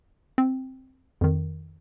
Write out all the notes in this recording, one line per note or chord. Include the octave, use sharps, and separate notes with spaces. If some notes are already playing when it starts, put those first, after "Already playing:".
C4
F2 D#3